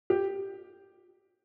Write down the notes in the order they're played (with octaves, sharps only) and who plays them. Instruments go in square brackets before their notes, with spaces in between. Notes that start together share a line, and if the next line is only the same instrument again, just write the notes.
[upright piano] G4